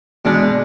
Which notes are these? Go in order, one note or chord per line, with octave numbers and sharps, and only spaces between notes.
B2 G#3 D4